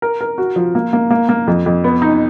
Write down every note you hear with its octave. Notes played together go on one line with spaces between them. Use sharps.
A#4
A#4
F#4
F3
A#3
A#3
A#3
A#3
F2
F2
B3
D#4